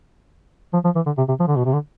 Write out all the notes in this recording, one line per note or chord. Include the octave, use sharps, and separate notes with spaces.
F3
F3
E3
D3
C3
C3
F3
D3
B2
C3
D3